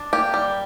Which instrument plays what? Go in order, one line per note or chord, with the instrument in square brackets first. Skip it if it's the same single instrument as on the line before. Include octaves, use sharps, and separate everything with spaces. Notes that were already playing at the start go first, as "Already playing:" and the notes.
Already playing: [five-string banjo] D4
A#3 G4
G3